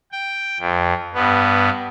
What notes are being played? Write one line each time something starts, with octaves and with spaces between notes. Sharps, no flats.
G5
F2
G2 B3